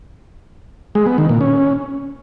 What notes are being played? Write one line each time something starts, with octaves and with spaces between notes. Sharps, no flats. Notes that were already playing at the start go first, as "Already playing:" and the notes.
G#3
B3
D#3
A#2
C#4